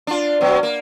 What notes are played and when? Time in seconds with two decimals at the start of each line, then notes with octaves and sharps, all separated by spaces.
0.07 D4 F4
0.41 B2 F#3
0.63 A#3